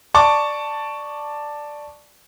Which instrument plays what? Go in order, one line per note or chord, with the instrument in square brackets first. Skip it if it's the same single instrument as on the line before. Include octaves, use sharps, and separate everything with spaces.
[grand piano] D5 A5 C#6 D6